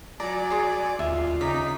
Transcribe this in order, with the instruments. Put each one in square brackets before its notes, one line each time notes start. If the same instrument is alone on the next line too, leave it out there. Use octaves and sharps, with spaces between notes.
[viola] F#3 [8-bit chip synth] D5 [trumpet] G#5 [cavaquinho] A#5
[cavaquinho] G#4 C6
[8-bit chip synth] D#2 [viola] F4 [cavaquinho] E5
[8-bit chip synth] C#3 B6 [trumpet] D#4 [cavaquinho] D6